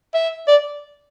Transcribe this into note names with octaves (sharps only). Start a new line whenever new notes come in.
E5
D5